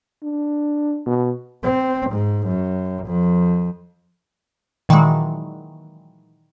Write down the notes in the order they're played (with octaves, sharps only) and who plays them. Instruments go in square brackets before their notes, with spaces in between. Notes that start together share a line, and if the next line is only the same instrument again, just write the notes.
[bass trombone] D4
B2
[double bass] C4
G#2
F#2
F2
[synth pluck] A#2 D#3 E3 F#3 G#3